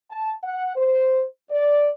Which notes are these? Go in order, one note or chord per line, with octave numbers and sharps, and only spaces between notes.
A5
F#5
C5
D5